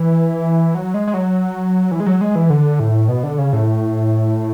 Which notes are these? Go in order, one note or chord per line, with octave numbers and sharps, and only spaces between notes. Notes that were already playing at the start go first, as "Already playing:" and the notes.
Already playing: E3
F#3
G#3
G#3
F#3
E3
G#3
F#3
G#3
E3
D3
A2
B2
D3
C#3
A2